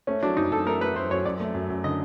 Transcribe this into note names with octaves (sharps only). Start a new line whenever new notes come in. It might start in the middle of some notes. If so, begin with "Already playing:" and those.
A3 C#4
F#3 D4
F#2 D#4
F#2 A4
A3 A#4
A3 B4
F#2 C5
F#2 C#5
F#2 D5
A3
F#2
F#2
D3 D#5